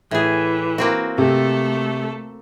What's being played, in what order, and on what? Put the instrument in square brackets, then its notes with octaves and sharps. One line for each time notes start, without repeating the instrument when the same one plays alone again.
[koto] A2 G#4 [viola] E3
[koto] A#3 C4 F#4
[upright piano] C3 [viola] A3 A4